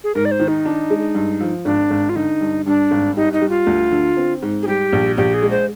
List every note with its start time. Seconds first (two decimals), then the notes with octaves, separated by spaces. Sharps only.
0.04 G#4
0.15 G#2 A#4
0.25 D5
0.31 C5
0.40 D#3
0.48 D#4
0.65 D4
0.90 G#3
1.15 G2
1.40 F3
1.65 G#1 D4
1.90 G#1
2.09 F4
2.16 D3 D#4
2.41 G2
2.66 G2 D4
2.91 G#1
3.16 G3 D#4
3.33 D#4
3.41 G3
3.50 F4
3.67 D2
3.92 D3
4.17 C4
4.42 G#2
4.62 G#4
4.67 G3 G4
4.92 A#1
5.17 A#1 G4
5.34 G#4
5.43 G#3
5.51 C5